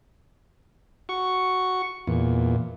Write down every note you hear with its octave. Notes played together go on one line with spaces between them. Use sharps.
F#4 C#6
E2 A#2